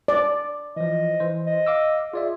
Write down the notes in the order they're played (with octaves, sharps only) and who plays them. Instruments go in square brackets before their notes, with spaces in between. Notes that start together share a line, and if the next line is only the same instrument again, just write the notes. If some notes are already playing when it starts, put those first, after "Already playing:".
[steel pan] D5
[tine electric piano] E3 F3 [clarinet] D#5
[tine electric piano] E3 C5
[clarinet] D#5
[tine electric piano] F5 D6 E6
[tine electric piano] F4 D5 E5 [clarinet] G#4